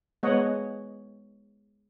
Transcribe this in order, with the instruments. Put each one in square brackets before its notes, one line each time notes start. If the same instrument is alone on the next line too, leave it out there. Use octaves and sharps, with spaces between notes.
[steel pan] G#3 B3 C#5 D#5 F#5